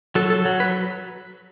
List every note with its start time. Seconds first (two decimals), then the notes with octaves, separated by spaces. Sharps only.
0.15 F#3 A4
0.30 A4
0.45 F#3
0.60 B4